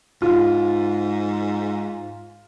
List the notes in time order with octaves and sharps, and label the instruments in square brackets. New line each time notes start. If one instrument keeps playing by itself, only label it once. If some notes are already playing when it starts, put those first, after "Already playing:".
[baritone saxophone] G#2 [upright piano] F4